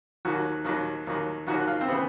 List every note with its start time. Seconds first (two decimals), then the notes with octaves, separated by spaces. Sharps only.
0.25 D#2 D#3 F#3 F#4
0.65 D#2 D#3 F#3
1.07 D#2 D#3 F#3
1.47 D#2 D#3 F#3 F#4
1.67 F4
1.81 C4
1.88 C#3 E3 B3